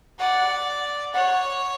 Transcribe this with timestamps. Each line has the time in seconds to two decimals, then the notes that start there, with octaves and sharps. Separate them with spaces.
0.20 D5 F#5
1.14 C#5 F#5